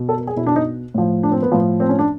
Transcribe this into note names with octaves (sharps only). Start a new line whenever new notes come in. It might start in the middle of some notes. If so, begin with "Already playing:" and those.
Already playing: B2
A4
A#4
G#4
B2 E4
D4
D#4
A2 F3
D4
C4
B3
A2 F3
C4
C#4
D4